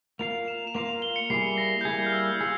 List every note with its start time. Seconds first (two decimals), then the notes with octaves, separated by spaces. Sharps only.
0.19 A#3 F4 A#4 F5 F7
0.48 E7
0.67 E7
0.74 A#3 F4 A#4 F5 F7
0.89 F7
1.02 G7
1.16 C#7
1.30 G3 A#3 E4 G#4 C7
1.58 A#6
1.81 G6
1.85 G3 A#3 E4 G#4 G#6
2.06 F6
2.13 E6
2.40 F4 G#4 E6